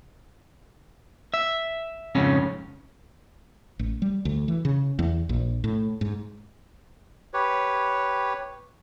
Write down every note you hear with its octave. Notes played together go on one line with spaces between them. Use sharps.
E5
F2 G#2 C#3 C#4
A1
G3
D2
E3
C#3
E2
A#1
A2
G#2
G4 B4 C#5